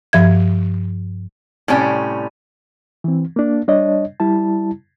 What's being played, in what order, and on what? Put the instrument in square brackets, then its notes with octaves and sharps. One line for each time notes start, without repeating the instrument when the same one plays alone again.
[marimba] G2 F3 E5 G#6
[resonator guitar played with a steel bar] A2 C3 G3 C#4 E4 D5
[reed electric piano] E3 C4
A#3 D4
G3 D4 C#5 D#5
G3 E4 A5